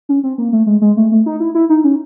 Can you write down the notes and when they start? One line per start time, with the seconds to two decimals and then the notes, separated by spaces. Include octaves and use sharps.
0.09 C#4
0.24 C4
0.38 A#3
0.52 A3
0.66 G#3
0.82 G#3
0.97 A3
1.11 A3
1.26 D#4
1.40 E4
1.55 E4
1.69 D#4
1.84 C#4